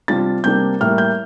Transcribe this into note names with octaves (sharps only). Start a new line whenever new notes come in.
C3 G3 D4 F4 A6
C3 G3 A#3 D4 G6
A2 G3 A#3 F6
G6